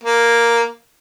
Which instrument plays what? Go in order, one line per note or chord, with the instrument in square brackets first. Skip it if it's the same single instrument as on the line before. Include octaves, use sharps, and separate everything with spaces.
[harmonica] A#3